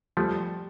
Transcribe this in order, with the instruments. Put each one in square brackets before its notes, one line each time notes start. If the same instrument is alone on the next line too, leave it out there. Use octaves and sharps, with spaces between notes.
[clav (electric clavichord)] F3 A3 [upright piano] G3